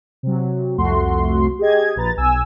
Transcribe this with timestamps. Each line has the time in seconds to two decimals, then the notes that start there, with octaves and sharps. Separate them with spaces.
0.23 C3 F#3
0.77 C2 F2 A3 F#4 C6
1.59 G4 G#4 D#5 G#6
1.96 A#1 B4 A#5 A6
2.17 B1 G#5 E6